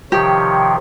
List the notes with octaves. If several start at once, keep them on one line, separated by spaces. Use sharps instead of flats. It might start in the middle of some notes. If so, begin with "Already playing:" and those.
C3 D#3 F3 G4 C#5 G5